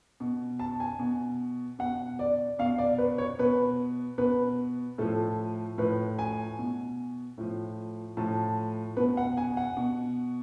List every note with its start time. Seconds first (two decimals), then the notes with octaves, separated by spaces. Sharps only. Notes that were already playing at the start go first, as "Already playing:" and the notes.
0.20 B2
0.59 A5
0.80 G#5
0.99 B2
1.79 B2 F#5
2.19 D5
2.59 B2 F5
2.78 D5
2.98 B4
3.18 C#5
3.39 B2 B4
4.18 B2 B4
4.98 A2 F3 A4
5.78 A2 F3 B4
6.19 G#5
6.59 B2
7.38 A2 F3
8.17 A2 F3 A5
8.97 B2 B4
9.17 F#5
9.37 G#5
9.57 F#5
9.77 B2